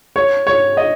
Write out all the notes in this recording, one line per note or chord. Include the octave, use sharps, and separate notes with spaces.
C#5
C#5
D#5